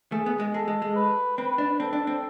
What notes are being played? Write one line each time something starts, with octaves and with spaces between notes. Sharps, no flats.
A3 G#4
B3
G#3
G#3 A4
G#3
G#3
B4
C4 B4
D4
C4 A4
D4
C4